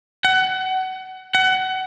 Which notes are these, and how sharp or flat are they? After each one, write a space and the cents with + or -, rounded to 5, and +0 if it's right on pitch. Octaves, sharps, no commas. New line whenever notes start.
F#5 +25
F#5 +25